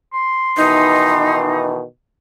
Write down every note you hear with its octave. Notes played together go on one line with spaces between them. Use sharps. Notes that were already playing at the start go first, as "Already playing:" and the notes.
C6
B2 D#3 E3 D#4